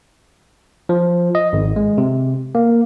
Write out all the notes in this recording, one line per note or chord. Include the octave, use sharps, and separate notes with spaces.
F3
D#5
G#1
G#3
C3
A#3